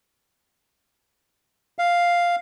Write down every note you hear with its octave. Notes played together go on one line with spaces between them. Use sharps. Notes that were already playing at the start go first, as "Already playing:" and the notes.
F5